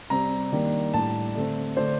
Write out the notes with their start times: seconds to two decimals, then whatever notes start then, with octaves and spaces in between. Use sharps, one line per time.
0.10 C3 G3 C4 A#5
0.52 D#3 G3 A#3 D4
0.94 A2 G3 D4 A5
1.35 D3 A3 C4
1.76 D3 A3 D4 C5